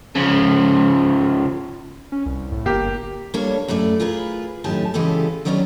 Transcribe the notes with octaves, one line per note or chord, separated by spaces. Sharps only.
C#3 F3
C#4
C2
A2
G1 A#3 G4
G3 A#3 D4 A4 C#5
F#2 A2 A3 D5
F4 G#4 A#4 B4
F#2 A2 D#3 G4 G#5 A5
C#3 E3 G#3 B3 G4 A4
D#3 F#3 G3 B3 C#4 D4